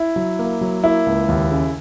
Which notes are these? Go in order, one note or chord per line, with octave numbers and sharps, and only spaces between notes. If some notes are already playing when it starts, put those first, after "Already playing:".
Already playing: E4
F#3
A#3
F#3
A#3 E4
C#2
D#2
C#3